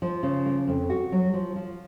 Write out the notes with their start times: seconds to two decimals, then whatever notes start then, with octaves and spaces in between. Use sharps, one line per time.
0.02 F3
0.23 C#3
0.46 A#3
0.67 F2
0.90 F#4
1.12 F#3
1.33 F3
1.56 F3